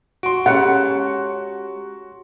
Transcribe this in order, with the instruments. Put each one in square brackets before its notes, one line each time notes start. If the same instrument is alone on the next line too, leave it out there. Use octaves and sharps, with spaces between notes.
[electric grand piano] F#4 C6 [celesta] D7
[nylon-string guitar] G#3 C#4 A4 [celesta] G4 C#5 A#5 [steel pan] F#5